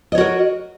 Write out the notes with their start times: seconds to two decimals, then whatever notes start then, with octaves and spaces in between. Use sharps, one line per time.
0.12 D#5
0.15 C#5
0.18 F#4
0.20 A#4